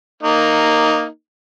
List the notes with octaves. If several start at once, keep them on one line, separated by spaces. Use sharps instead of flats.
A#3 D#4